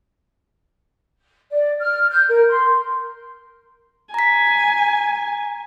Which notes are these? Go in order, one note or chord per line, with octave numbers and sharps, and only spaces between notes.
D5
F6
G6
A#4
C6
G#5 A#5 B6